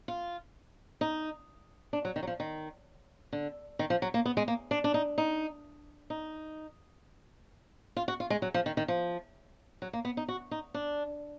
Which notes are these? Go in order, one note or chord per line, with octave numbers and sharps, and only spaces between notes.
F4
D#4
D4
F#3
D#3
F#3
F3
D#3
D3
D#3
F3
F#3
A#3
B3
G#3
A#3
D4
D4
D#4
D#4
D#4
F4
F#4
F4
G#3
F#3
F3
D#3
D#3
F3
F#3
A#3
B3
D#4
F#4
D#4
D4